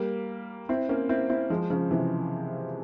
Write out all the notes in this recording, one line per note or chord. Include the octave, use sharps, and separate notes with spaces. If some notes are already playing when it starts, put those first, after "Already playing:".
Already playing: G3 A#3
C4 E4
A#3 C#4
C4 E4
C4 E4
F3 G#3
C#3 F3
C3 E3